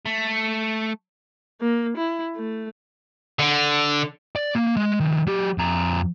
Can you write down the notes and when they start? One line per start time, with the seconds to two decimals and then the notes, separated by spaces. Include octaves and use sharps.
0.06 A3
1.61 A#3
1.97 E4
2.36 A3
3.39 D3
4.36 D5
4.55 A#3
4.77 G#3 C6
5.00 D#3 F3
5.27 F#3 G4
5.58 F2 A#5